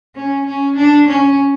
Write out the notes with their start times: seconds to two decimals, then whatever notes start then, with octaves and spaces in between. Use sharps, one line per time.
0.16 C#4
0.47 C#4
0.77 D4
1.08 C#4